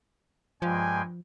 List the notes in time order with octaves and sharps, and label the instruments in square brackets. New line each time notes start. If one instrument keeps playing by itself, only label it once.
[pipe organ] G2 G#3 G5 [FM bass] F3 [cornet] G#5